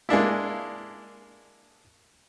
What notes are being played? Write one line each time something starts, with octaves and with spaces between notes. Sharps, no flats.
G#3 A#3 D4 E4